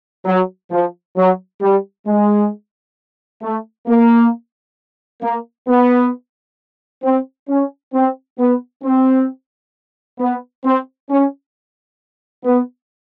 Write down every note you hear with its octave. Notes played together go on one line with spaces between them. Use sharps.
F#3
F3
F#3
G3
G#3
A3
A#3
A#3
B3
C4
C#4
C4
B3
C4
B3
C4
C#4
B3